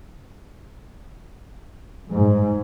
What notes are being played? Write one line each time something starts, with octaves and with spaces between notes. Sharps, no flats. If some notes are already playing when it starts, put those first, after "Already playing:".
G#2